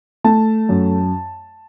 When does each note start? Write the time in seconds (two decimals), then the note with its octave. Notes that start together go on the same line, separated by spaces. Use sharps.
0.24 A3 A5
0.69 F#2